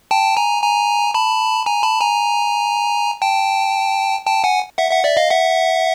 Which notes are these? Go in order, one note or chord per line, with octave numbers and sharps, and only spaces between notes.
G5 A5
G#5 A#5
G#5 A#5
A5 B5
G#5 A#5
A5 B5
G#5 A#5
G5 A5
G5 A5
F#5 G#5
E5 F#5
E5 F#5
D5 E5
D#5 F5
E5 F#5